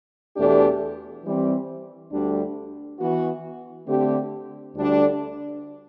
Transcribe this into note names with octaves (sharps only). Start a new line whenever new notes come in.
E2 B2 A3 D4 G4
E3 G3 C4
D2 D3 G3 D4
E3 B3 F#4
D3 A3 C4 G4
D2 D3 G3 D4